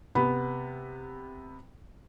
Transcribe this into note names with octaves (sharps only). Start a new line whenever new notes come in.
C3 B3 B5